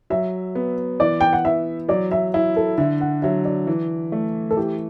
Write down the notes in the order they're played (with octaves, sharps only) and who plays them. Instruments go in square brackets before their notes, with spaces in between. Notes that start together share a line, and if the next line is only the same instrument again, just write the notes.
[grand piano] F#3 [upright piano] E5
[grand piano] B3
[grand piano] E3 [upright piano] D5
[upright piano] G5
F#5
[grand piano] E3 [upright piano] E5
[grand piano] F#3 [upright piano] D5
[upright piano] E5
[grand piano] E4 [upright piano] E5
[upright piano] A4
[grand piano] D3 [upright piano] E5
[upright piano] F#5
[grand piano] F#3 [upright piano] E5
[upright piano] D5
[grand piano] E3
A3
[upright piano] A4
[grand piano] E3 [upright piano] G4